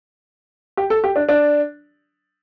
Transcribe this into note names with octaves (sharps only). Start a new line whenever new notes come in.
G4
A4
G4
D4
D4